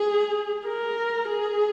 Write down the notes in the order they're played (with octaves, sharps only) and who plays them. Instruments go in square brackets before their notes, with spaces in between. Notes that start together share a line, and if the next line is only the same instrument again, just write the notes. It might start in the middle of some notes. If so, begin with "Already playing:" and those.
Already playing: [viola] G#4
A#4
G#4